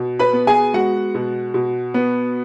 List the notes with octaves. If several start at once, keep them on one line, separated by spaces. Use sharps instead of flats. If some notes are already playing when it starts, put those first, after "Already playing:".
Already playing: B2
B4 B5
B3
G#4 G#5
G#3 F#4 F#5
B2
B2
B3